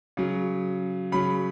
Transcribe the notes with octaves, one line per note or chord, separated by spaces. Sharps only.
C#3 F#3
C#3 F#3 B5